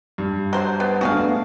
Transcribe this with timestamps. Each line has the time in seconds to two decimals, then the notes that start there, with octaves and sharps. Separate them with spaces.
0.18 G2
0.53 F#3 C5
0.80 B3
1.01 A3 B3 D4 F#4 G#4 F5
1.15 D4